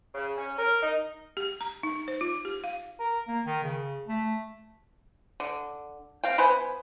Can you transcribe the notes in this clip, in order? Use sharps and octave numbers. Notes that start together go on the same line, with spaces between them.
C#3
C#4
A#4
D#4
G4
A#5
D#4
C5
F4
G4
F5
A#4
A#3
D#3
C#3
A3
D3
C4 F5 G5
B3 B4 C5 G#5